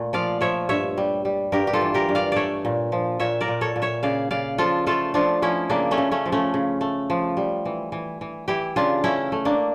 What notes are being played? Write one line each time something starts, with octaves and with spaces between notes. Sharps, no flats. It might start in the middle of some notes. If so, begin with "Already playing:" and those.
Already playing: A#2 A3
F3 D5 F5
F3 C#5 E5
G2 C#5 E5
G3
G3
G2 G4 A#4
G4
F4 A4
E3
G4 A#4
G2
D5 F5
A3 C#5 D5 E5
A#2
F3
A#2 C#5 E5
A#4 D5
A#2
A4 C#5
A#2
C#5 E5
C#3 D5 F5
C#3 D5 F5
F3 F4 A4
A3 F4 A4
F3 D4 F4
F3 C#4 E4
C#3 A#3 D4
A3 C#4
C#3
A3 C#4
F3
A3 C#4
C#3
A3
F3
G3
E3
E3
E3
E3 E4 G4
C#3 D4 F4
A3 C#4 E4
A3
A#3 D4